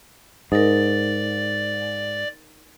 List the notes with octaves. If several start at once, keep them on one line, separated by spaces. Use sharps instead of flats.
G#2 D#4 A#4 D5